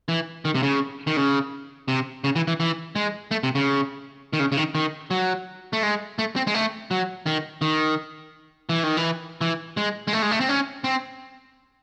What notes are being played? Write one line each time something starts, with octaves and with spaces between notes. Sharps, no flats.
E3
D#3
C3
C#3
D#3
C#3
C3
C#3
E3
E3
E3
G#3
A3
C3
C#3
D#3
C#3
C#3
D#3
D#3
F#3
A3
G#3
A3
C4
G#3
A3
F#3
D#3
D#3
E3
D#3
E3
E3
G#3
G#3
A3
G#3
A3
C4
C#4
C4